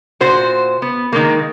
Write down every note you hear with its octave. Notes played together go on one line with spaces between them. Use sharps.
A#2 F#4 C5
B3
D#3 G#3 A#3